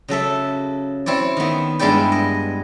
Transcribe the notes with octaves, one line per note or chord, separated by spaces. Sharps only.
C#3 F#3 A4 E5
C4 E4 C#5 D5
D#3 B3
G2 G#3 B3 E4 D5 G5
D#5